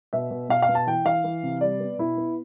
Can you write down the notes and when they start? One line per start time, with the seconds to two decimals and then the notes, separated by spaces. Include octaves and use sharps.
0.13 B2 E5
0.31 B2
0.49 B2 F5
0.62 F5
0.69 B2
0.75 A5
0.87 E3 G5
1.05 E3 F5
1.24 E3
1.43 C3
1.61 G3 D5
1.80 B3
1.98 B2 E4
2.17 B3